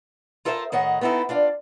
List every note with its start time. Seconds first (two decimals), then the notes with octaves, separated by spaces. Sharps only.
0.45 F4 A4 A#4 C5 D5 E5
0.72 A2 D#3 C#5 D#5 F#5
1.01 B3 C4 D#4 E4 A4
1.29 D4 F4 D5